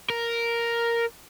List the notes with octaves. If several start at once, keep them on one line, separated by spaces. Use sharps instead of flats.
A#4